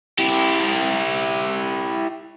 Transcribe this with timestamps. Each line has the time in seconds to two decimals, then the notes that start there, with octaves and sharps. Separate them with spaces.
0.19 E4 G4